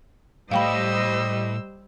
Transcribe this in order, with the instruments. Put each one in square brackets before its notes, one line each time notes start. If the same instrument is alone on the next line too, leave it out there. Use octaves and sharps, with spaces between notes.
[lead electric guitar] A2 [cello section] G3 D#5 [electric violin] C5 E6 [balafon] F5 G5 B5